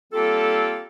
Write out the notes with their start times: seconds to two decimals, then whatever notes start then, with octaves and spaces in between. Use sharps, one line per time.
0.13 G3 A#3 C4 F4 G4 A4